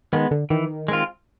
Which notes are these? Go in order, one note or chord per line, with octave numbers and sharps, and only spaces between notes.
D#3 G#3 B3
D3
D#3 E3
G#3 C4 F4